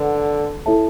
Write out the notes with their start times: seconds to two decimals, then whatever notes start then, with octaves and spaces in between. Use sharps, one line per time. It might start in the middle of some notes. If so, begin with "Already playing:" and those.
Already playing: D3 B4 F#5
0.66 E4 A4 C#5 E5 A5